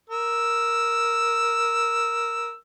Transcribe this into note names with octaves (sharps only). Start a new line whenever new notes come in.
A#4 E6